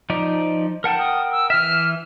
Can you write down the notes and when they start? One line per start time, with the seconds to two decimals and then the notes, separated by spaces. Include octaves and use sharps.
0.10 F3 D#4 D5
0.84 A#4 F#5 G5 A5
0.99 D#6
1.31 E6
1.50 E3 E5 F6